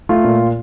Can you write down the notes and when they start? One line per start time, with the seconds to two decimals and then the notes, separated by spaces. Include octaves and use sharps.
0.09 A3 F4
0.24 A#2